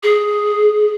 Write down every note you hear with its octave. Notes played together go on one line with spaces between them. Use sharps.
G#4